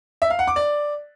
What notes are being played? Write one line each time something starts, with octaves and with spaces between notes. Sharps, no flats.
E5
F5
F#5
D6
D5